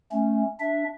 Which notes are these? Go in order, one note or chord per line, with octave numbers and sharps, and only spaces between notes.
A3 C#4
D4 E5